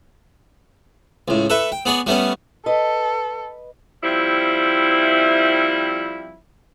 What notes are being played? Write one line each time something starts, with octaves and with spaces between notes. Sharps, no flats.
C#2 A2
A4 B4 E5 C#6
G5
B3 G#4 C#5 D5
G3 A3 B3 C#4
A4 B4 D#5
F3 G3 C4 E4